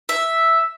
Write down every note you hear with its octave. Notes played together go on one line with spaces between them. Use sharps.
E5